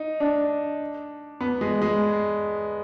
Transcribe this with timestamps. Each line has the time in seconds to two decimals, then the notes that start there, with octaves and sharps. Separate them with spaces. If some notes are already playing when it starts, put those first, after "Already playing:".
Already playing: D#4
0.20 D4
1.41 B3
1.61 G#3
1.82 G#3